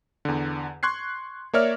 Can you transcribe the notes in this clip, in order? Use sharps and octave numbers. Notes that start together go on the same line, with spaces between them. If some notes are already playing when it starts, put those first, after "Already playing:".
E2 D3
C6 C#6 F#6 G#6 C7
A#3 A#4 C#5 D5 E5 F6